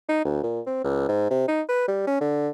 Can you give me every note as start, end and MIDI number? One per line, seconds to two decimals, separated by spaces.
0.09 0.22 63
0.25 0.42 38
0.44 0.61 46
0.67 0.79 60
0.84 1.05 37
1.08 1.26 44
1.30 1.45 48
1.48 1.62 63
1.69 1.83 71
1.88 2.04 55
2.07 2.20 61
2.21 2.49 50